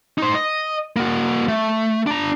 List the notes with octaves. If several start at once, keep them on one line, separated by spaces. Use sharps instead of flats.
D#4 C5
D#5
A#3 F#4
A3
D4 A#5